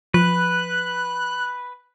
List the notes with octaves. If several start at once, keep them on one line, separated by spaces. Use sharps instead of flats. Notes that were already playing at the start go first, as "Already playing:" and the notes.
F3 B4 F#6